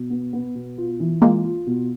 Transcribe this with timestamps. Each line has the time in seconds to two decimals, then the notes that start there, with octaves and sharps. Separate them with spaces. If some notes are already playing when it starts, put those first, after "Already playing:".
Already playing: B2
0.10 B3
0.33 B3
0.55 B2
0.78 F4
1.00 E3
1.22 G#3 A#3 F4
1.44 F4
1.67 B2